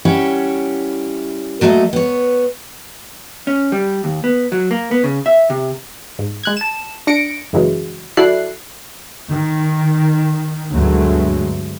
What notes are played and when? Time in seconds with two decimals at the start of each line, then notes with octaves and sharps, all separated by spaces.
0.05 G3 C#4 E4 C#5 F#5
1.61 A#2 F#3 A3 D#5 E5
1.93 B3 C#5
3.47 C#4
3.72 G3
4.04 D#2
4.24 B3
4.52 F#3
4.71 A#3
4.91 B3
5.04 C#3
5.26 E5
5.50 C3
6.19 G#2
6.44 G#3 F#6 G#6
6.57 A5 E7
7.07 D4 A#6 C#7 D7
7.53 F#2 C#3 E3 F#3 G#3
8.17 F#3 E4 A4 D5 F#6 C7
9.32 D#3
10.72 D2 G2 B2 F#3 G#3 A3